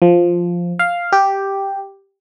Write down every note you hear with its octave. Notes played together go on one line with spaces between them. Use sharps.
F3
F5
G4